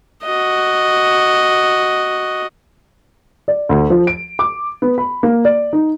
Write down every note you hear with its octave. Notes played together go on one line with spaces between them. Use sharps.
F#4 D#5
D5
D2
F3
D7
D6
B3
B5
A#3
D5
D#4